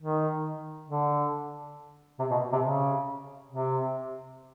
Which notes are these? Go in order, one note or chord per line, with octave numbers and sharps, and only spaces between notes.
D#3
D3
C3
B2
C3
C#3
C3